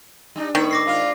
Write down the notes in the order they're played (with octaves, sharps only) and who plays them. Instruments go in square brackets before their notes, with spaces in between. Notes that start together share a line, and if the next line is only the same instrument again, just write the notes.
[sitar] G3 D4 [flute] D#4
[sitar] A2 B3 E5 [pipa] D#3 [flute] C#6
[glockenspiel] D6 A#6 C7
[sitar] G#2 D4 F4 [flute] F5